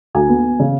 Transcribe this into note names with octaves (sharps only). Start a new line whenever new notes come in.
D2 G#5
B3
B3
C#3